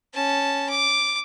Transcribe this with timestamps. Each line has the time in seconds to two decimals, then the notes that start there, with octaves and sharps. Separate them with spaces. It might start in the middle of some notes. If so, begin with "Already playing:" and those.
0.14 C#4 A5
0.69 D6